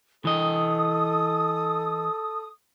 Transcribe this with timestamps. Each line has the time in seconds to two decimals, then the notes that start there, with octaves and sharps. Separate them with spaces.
0.25 E3 A4 D#5 D#6